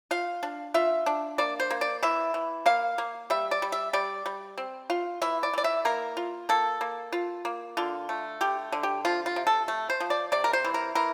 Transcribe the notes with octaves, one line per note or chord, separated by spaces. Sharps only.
F4 F5
D4
F4 E5
D4
A#3 D5
C5
A#3
D5
E3 E5
E3
A#3 F5
A#3
G3 E5
D5
G3
E5
G3 D5
G3
C4
F4
E3 E5
D5
E3 D5
E5
A#3 A#4
F4
A#3 A4
A#3
F4
A#3
D3 F4
A3
D3 G4
D3
G4
F3 F4
F4
C3
A4
A3
C5
F3
D5
C3 D5
A#4
C5
E3
A#4
E3 A#4